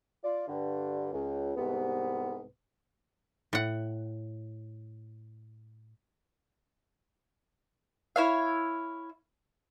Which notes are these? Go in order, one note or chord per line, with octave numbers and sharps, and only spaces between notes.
F4 D5
G2 D3
C#2
C2 G#2 C3 B3
A2 F#5
E4 C#5 F5